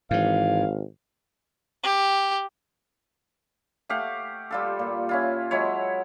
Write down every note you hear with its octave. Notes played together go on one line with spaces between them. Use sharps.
G#1 G#2 E3 F5
G4
A3 G4 F5 F#5
G3 F4 A4
A#2
C#4 E4 F4
F#3 G#3 E4 C#5